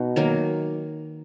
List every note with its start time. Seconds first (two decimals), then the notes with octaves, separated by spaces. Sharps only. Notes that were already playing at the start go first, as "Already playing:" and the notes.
Already playing: B2 D#4 F#4
0.16 D#3 F#3 A#3